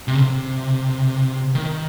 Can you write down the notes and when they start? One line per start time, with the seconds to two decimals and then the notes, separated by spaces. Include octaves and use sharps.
0.08 C3
0.15 C#3
0.22 C3
1.55 D#3